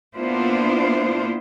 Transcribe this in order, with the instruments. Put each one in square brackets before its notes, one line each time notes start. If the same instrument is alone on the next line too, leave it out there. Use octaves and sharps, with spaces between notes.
[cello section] A#3 B3 D4 E4 F4 C5